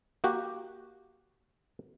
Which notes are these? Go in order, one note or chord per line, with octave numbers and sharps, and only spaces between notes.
A#3 F#4 G4